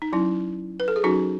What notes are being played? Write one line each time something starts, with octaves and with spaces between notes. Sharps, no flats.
D#4
F#3 C#4 E4
B4
A4
G#4
F#3 C#4 D#4 F#4